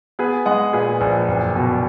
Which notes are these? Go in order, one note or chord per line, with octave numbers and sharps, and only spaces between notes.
B3 G#4 B4
G#3 D#5 F#5
A#2 G#4 B4
A#1
F#1
B2